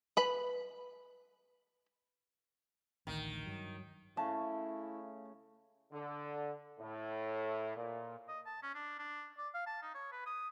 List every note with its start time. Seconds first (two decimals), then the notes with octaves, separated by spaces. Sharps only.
0.17 B4 B5
3.07 A1 D2 D#3
3.46 G2 F#3
4.17 C#3 A3 E4 A5
5.92 D3
6.79 A2
7.76 A#2
8.28 D#5
8.46 A5
8.62 C#4
8.75 D4
8.99 D4
9.38 D5
9.54 F5
9.66 A5
9.82 D#4
9.95 C#5
10.12 B4
10.26 D#6